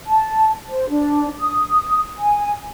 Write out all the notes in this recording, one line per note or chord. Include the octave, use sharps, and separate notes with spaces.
A5
C5
D4
D#6
G#5